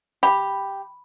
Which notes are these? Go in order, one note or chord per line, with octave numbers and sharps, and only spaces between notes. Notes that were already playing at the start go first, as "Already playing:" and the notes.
G4 B5